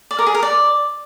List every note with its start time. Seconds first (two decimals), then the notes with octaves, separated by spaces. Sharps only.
0.11 D5
0.19 A#4
0.27 G#4
0.35 A#4
0.43 D5